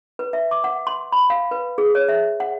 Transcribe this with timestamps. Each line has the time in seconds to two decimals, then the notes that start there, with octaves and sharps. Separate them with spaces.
0.19 B4
0.33 E5
0.51 D6
0.64 F#5
0.87 C6
1.12 B5
1.30 F5
1.51 B4
1.78 G#4
1.95 C#5
2.09 E5
2.40 F#5